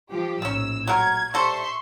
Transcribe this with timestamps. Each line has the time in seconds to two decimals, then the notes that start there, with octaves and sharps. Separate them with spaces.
0.11 F3 G4
0.42 A#1 A2 D#3 C#4 E6
0.87 F#3 A3 A#4 G#6
1.34 G3 A4 C5 E5 C6 C#6